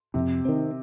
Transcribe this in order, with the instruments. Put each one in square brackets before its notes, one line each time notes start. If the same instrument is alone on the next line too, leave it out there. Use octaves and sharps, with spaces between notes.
[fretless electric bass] F2 [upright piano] C3
[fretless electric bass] D#3 C4